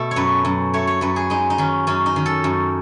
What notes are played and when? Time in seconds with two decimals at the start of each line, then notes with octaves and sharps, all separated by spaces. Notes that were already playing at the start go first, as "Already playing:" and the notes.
Already playing: B2 A3 A4
0.11 C#5
0.16 F#2 B4
0.45 F#2
0.74 A3 C#5
0.87 C#5
1.01 F#2 B4
1.16 G#4
1.30 G#3 D#4
1.50 D#4
1.58 D#3 C#4
1.87 F#2 C#4
2.06 D#4
2.16 D#3
2.26 A4
2.44 F#2